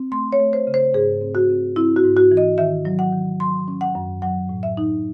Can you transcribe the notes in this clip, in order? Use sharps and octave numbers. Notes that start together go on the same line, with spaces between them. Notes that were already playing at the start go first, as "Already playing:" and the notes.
Already playing: C4
A3 C6
C#5
A3
C5
C#3
C5
G#2 G#4
C4
F#4
C4
C4 E4
F#4
G#2
F#4
E3
D#5
D#3 E5
F#3
F#5
D#3
F#3 C6
C#4
F#5
F#2
F#3 F#5
A2
E5
D#4